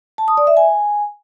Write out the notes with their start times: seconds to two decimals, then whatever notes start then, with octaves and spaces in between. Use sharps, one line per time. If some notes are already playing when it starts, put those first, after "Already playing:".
0.18 A5
0.28 D#6
0.37 D5
0.47 E5
0.57 G#5